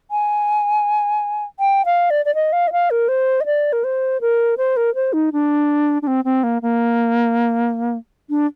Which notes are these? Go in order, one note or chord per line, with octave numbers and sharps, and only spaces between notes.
G#5
G5
F5
D5
D5
D#5
F5
D#5
F5
A#4
C5
D#5
D5
A#4
C5
A#4
C5
A#4
C5
D#4
D4
D4
C4
C4
A#3
A#3
D4